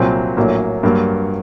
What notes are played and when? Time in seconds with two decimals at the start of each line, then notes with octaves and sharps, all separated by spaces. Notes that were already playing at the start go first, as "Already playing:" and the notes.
Already playing: C2 A#2 F#3 C4
0.37 A#1 A2 F#3 A#3
0.83 G2 F#3 A#3